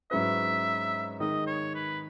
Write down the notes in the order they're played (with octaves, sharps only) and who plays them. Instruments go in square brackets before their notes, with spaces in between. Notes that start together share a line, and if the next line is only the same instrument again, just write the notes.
[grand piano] G#2 F#3 C#4 E4 B4 [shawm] E5
[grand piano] D#3 G#3 D#4 [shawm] D#5
[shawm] C#5
B4